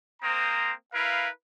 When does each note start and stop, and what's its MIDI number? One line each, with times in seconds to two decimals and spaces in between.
0.22 0.71 58
0.22 0.71 60
0.22 0.71 72
0.22 0.71 82
0.22 0.71 87
0.93 1.27 64
0.93 1.27 70
0.93 1.27 71
0.93 1.27 77